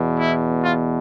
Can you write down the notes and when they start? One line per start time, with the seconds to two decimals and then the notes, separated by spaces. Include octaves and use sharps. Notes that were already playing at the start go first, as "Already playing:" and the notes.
Already playing: E2 B2
0.18 E4
0.63 F4